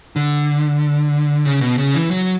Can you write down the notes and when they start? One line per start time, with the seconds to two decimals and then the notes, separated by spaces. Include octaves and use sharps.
0.16 D3
1.45 C#3
1.61 B2
1.78 C#3
1.95 E3
2.11 F#3